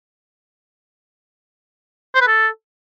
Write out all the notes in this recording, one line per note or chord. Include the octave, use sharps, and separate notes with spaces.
C5
B4
A4